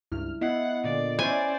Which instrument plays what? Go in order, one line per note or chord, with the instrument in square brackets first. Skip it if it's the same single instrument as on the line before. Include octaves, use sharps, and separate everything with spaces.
[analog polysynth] C#2 G2 F6 [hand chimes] E4
[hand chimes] B3 D#5 C7 [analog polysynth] E4 [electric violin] F#5
[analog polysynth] A#2 D3 [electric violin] D5
[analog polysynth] C#4 E4 [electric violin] C5 D5 [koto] G#5